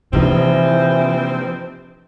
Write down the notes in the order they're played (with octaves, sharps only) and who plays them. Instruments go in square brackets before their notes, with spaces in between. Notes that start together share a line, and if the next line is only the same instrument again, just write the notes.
[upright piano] F1 A#1 D#4 [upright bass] C3 [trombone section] E3 [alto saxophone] C4